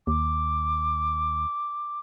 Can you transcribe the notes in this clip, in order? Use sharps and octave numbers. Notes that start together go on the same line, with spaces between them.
D#2 D6